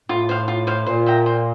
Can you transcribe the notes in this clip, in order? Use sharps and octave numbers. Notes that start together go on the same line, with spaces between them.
A2 F4
C5 F5
F4
C5 F5
A#2 C5
E5 G5 A#5
C5